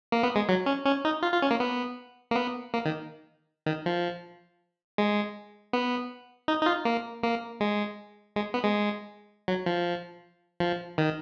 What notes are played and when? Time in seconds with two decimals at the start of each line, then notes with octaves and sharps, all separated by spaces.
0.12 A#3
0.23 B3
0.36 G#3
0.49 F#3
0.66 C#4
0.86 C#4
1.05 D#4
1.23 F4
1.33 F4
1.42 C#4
1.51 A#3
1.60 B3
2.31 A#3
2.36 B3
2.74 A#3
2.85 D#3
3.66 D#3
3.86 F3
4.98 G#3
5.73 B3
6.48 D#4
6.62 D#4
6.66 F4
6.85 A#3
7.23 A#3
7.61 G#3
8.36 G#3
8.54 B3
8.64 G#3
9.48 F#3
9.66 F3
10.60 F3
10.98 D#3